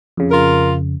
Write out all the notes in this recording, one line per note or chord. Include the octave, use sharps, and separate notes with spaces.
F2 C#3
F4 A#4